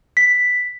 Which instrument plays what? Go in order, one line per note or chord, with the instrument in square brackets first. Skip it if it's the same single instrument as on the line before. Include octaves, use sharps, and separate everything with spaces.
[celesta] B6